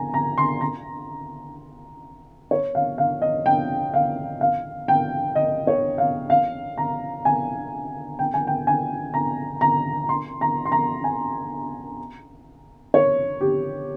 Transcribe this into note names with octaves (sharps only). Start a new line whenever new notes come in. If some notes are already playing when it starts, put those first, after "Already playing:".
Already playing: G#5 A#5
A#5
C6
A#5
C#5
F5
F5
D#5
G5
F5
F5
G5
D#5
C#5
F5
F5
A#5
G#5
G5
G#5
G5
G#5
A#5
A#5
C6
A#5
C6
A#5
G#5
C#5
G4